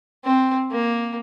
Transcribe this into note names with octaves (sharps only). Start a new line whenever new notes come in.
C4
A#3